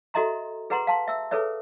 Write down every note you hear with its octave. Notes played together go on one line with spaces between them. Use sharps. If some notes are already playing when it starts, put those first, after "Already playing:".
F#4 A4 D#5 E5 A#5 C6
G#4 B4 F#5 A#5 C6
F5 A5 C6
E5 E6
G#4 A4 B4 C#5 E5